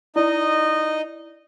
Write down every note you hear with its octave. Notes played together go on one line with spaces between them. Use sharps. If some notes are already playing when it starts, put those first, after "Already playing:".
D#4 E4 D5 D#5